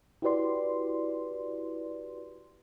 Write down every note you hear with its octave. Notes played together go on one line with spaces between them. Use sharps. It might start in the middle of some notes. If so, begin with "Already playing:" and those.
E4 F#4 G4 B4 D5 C6